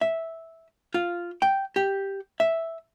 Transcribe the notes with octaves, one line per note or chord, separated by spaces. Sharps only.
E5
F4
G5
G4
E5